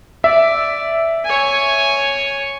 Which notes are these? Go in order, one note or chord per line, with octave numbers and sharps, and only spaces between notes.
D5 E5
C#5 G#5